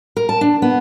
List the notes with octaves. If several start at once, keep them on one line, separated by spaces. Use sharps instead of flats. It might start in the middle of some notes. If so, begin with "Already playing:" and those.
A#4
A5
D4
B3